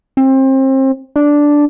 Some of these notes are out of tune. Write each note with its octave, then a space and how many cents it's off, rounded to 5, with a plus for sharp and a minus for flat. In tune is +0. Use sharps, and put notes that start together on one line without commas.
C4 +30
D4 -5